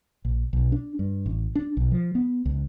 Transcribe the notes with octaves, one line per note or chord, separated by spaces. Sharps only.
A#1
B1
D4
G2
A1
D4
B1
F3
B3
C#2